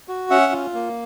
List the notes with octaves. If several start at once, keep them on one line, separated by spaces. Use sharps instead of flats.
F#4
C#4 E5 F#5
F4
A#3